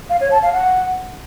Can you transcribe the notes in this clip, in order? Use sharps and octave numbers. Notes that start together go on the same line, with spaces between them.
F5
C#5
A5
F5
F#5